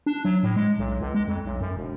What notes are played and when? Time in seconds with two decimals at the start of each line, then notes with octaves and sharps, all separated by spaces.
0.06 D4
0.25 F#3
0.43 A2
0.56 G#3
0.79 B1
1.01 C#2
1.14 G#3
1.27 F2
1.45 B1
1.60 F#2
1.76 E1